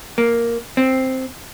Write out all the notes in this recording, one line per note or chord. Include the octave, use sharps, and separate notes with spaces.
A#3
C4